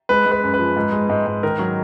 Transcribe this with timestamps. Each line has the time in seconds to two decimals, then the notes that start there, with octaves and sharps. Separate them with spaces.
0.09 G#3 B4
0.26 G#3
0.32 B4
0.43 F#2
0.54 B4
0.59 F3
0.77 G#2
0.92 G#3
1.10 G#2
1.27 G#2
1.43 D#3 A#4
1.59 F#3